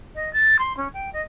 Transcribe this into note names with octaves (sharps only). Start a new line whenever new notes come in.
D#5
A6
C6
C#4
G5
D#5